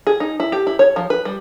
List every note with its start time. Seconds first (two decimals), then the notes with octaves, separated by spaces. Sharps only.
0.07 G#4
0.20 D#4
0.40 E4
0.52 G4
0.67 E4
0.79 C#5
0.96 F3
1.10 B4
1.25 G3